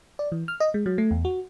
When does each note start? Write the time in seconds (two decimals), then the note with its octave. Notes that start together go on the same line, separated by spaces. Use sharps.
0.19 D5
0.32 E3
0.48 F6
0.60 D#5
0.74 G#3
0.86 F#3
0.98 A3
1.11 E2
1.25 F#4